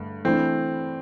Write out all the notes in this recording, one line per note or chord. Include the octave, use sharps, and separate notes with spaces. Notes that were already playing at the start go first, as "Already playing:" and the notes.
Already playing: G2 D3 A3
E3 A3 C4 D4